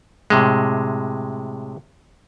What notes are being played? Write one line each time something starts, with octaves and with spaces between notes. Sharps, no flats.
A2 C3 G#3